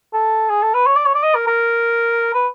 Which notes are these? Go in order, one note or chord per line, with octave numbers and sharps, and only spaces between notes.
A4
G#4
A4
B4
C#5
D5
C#5
D5
D#5
A#4
A#4
B4